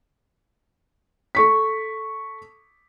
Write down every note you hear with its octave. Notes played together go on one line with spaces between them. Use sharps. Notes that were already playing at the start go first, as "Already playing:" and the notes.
A4 C#6 B6